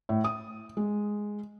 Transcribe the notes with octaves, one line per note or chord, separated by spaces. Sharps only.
A2
D#6
G#3